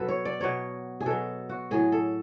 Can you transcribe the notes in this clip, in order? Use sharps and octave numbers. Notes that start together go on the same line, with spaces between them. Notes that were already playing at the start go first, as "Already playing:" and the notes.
Already playing: B2 F#3 A4 B4
C#5
D5
B2 F#3 C#5
G#4
B2 F#3 A4
F#4
A2 F#3 G#4
A4